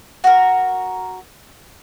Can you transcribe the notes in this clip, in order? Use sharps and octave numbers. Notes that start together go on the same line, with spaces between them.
F#4 A#4